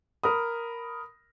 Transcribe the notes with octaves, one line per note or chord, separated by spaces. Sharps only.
A#4 B5 D#6